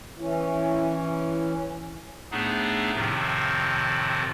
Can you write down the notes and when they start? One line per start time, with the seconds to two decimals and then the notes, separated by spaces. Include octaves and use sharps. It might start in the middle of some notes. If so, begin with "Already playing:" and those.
0.19 E3 C#4 E4
2.31 A2 A3 B3 D4 D#4 G#4
2.95 F2 A2 C3 D#3 F3